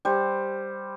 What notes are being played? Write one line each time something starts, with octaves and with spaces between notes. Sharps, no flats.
G3 C5